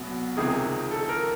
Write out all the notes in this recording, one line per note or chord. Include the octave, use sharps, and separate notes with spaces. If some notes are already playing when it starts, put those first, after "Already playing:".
Already playing: C2 B2 F#3 B3
C#2 C3 D#3 G#4
A4
A#4